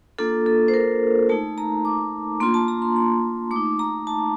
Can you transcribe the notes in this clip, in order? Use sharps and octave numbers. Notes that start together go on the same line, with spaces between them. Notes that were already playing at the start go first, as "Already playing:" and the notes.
A#3 D4 F4 A4
A4
C5
A#4
A3 D#4 A5
A#5
D6
A#3 D4 F4 C6
A5
A#5
C6
C6
A3 D6
D#4
A#5
A5